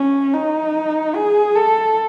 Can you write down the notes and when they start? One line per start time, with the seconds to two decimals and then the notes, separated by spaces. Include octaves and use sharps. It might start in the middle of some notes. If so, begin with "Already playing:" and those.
Already playing: C#4
0.34 D#4
1.15 G#4
1.55 A4